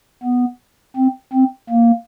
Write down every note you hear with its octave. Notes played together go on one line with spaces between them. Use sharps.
B3
C4
C4
A#3